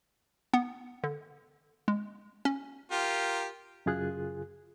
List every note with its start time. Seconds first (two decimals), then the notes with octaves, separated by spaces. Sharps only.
0.54 B3
1.04 D3
1.88 G#3
2.45 C#4
2.92 F4 G4 A#4
3.86 F#2 C#3 F4 G#4 G#5 F#6